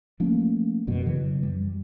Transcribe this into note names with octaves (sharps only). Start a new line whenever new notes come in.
F3 A3 A#3 C#4
F1 F#2 B2
C#3 E3 F#3
F#2 G3